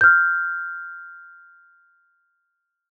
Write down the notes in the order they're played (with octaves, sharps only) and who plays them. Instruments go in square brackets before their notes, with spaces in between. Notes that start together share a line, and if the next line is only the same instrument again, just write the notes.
[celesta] F6 G6